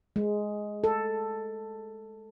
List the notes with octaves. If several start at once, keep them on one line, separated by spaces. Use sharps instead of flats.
G#3
A4